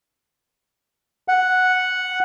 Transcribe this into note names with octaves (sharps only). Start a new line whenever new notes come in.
F#5